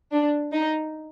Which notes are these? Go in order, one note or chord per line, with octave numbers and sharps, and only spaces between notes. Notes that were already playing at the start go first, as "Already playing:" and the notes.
D4
D#4